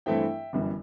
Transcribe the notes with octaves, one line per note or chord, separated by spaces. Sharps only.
G2 E3 A3 C4 E4 E5 G5
G1 F#2 E3 G3